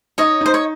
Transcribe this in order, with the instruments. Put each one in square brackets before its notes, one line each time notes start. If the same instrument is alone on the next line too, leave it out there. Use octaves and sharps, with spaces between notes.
[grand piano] D#4 [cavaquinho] C#5 D#5
[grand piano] D#4 [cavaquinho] C5
[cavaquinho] C#5